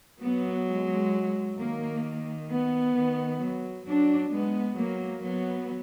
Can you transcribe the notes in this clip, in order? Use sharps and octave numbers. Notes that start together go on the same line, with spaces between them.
F#3 B3
G#3
D#3 A#3
B3
D#3
F#3
F#3 D4
G#3 B3
F#3 A#3
F#3 B3